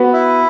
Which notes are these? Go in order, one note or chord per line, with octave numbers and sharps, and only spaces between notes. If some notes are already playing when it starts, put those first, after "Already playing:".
Already playing: B3 F#4 B4
E4 E5